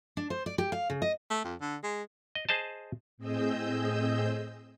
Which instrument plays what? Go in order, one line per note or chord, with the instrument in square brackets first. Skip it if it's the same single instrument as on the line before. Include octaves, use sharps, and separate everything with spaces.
[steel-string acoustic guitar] D4
C5
D5
G4
F5
C#3
D#5
[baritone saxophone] A3
F2
D3
G#3
[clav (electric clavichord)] D#5
G#4 C5 D#5 A5
[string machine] A2 C4 G#4 D#5 E6 G6